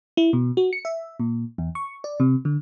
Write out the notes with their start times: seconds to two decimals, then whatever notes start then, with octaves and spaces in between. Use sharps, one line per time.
0.17 E4
0.33 B2
0.57 F#4
0.73 C#7
0.85 E5
1.20 A#2
1.58 E2
1.75 C#6
2.04 D5
2.20 C3
2.45 D3